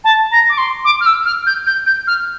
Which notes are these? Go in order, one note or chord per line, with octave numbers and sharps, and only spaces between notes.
A5
A#5
D6
C6
D6
F6
E6
F6
G6
G6
G6
F6